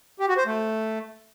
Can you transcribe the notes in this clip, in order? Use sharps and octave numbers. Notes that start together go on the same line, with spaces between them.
G4
F#4
C5
A3